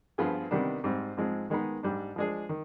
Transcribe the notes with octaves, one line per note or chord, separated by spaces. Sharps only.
G2 F3 B3 F4 G#4
C3 D#3 G3 B3 D4
G#2 G3 C4
G#2 F3 G#3 C4
D#3 G#3 B3 D#4
G#2 G3 D4
F3 G#3 D4 G#4
D#3